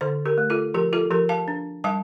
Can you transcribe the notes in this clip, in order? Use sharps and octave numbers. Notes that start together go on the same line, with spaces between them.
D3 A4 C5
G4 A#4
A3
F4 A4
F3 G4 A#4
F4 A4
F3 G4 A#4
F5 A5
D4
G3 F5 A5